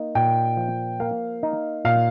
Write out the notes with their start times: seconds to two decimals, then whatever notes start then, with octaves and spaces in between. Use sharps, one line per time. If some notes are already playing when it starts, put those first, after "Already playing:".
Already playing: A#3 D#4
0.15 A#2 G5
0.57 F3
1.00 A#3 F5
1.43 D#4
1.85 A#2 F5